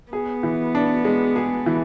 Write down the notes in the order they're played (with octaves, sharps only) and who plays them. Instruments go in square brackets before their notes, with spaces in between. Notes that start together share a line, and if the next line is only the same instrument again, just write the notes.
[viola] B3 [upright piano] G#4
[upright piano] E3
D4
G#3
G#4
E3